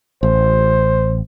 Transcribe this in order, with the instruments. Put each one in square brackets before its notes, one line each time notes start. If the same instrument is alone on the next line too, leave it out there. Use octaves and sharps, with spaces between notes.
[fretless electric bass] A1 [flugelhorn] C5